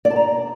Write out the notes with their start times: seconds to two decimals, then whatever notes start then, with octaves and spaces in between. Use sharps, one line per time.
0.05 D5
0.10 A5
0.16 A#5